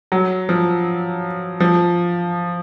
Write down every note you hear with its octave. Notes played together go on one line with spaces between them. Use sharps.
F#3
F3
F3